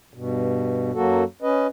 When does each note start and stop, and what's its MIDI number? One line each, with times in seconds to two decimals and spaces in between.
0.14 0.91 43
0.14 0.91 47
0.94 1.24 42
0.94 1.24 54
0.94 1.24 58
0.94 1.24 66
0.94 1.24 69
1.42 1.67 61
1.42 1.67 71
1.42 1.67 75